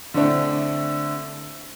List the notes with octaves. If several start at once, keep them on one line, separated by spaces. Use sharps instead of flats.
D3 A3 C4 D4 E4